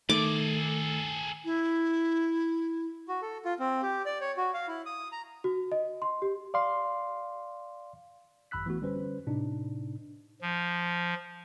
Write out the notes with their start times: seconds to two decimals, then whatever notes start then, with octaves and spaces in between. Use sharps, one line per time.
0.09 D#3 A3 G#4 A4 D6
1.45 E4
3.08 F#4
3.22 A4
3.45 F4
3.60 C4
3.82 G4
4.05 D5
4.21 C#5
4.37 F#4
4.54 F5
4.68 E4
4.86 D#6
5.12 A#5
5.44 F#4
5.72 D#5
6.02 C6
6.22 G4
6.54 D5 F5 C6
8.51 G#1 F#2 B5 E6 F#6 B6
8.66 E3 A3 B3 F#4
8.81 D3 G3 C#4 B4 C5
9.27 A2 C3 D4 D#4
10.42 F3